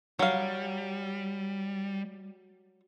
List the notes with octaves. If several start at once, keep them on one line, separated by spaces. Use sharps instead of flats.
F#3 G3 F5